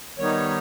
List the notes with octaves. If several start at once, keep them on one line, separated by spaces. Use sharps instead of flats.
D#3 G3 B3 D#4 C#5